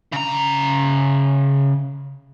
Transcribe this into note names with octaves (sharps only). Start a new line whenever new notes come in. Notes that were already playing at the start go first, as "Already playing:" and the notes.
C#3 A#5